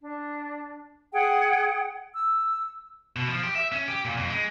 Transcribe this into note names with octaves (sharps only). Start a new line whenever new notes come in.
D4
G#4 F#5 G5
E6
B2
F3
G4
E5
C#4
G4
A#2
F2
G#3